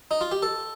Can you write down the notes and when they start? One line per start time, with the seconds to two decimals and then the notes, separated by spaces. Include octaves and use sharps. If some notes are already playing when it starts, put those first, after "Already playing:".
0.11 D#4
0.21 F4
0.32 G4
0.43 A4